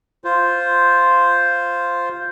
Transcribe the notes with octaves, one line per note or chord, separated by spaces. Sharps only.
F4 C5